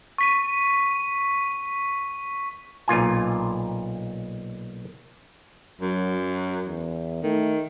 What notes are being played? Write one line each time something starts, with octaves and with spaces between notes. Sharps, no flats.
C#6 B6 D#7
B1 A#2 F4 G#5
F#2 F#3
F#4
E2
D#3 A3